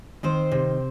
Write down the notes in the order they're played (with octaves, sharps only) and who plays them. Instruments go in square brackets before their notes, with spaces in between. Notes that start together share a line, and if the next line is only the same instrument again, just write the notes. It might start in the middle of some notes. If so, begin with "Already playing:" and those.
[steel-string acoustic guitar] D#3 C4 C5
C3